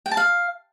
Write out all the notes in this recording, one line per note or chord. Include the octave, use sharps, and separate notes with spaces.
G5
A5
F5